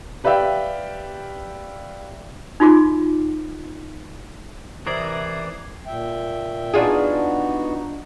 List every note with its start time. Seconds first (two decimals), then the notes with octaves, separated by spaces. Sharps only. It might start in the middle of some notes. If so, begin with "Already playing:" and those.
0.24 G4 B4 D5 E5 F5 G5
2.60 D#4 F4 F#4 D6
4.87 C3 E3 A#4 D5 D#6 G#6 C7
5.87 A#2 E5 G5
6.74 B3 D4 D#4 F4 F#4 G#4